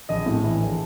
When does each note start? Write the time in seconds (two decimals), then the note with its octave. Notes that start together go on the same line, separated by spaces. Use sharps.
0.09 A#1 D#5
0.26 A2
0.44 E3
0.60 A#1